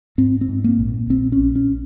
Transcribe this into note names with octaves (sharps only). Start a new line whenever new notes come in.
G#2 C4
C4
G#2
A#3
A#1
A#1 C4
C#4
A#1
C#4